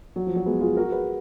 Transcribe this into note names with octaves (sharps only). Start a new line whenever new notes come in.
F#3
F3
F#3
G#3 B3
F4 G#4
F#4 A#4
G#4 B4